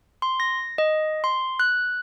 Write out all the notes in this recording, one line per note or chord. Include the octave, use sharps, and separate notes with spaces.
C6
A#6
D#5
C6
F#6